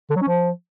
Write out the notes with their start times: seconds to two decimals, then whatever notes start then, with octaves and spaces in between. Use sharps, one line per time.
0.10 D3
0.16 F#3
0.22 C#4
0.27 F3